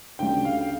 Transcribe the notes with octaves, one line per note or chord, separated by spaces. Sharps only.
D2 C#3 G3 G5
F5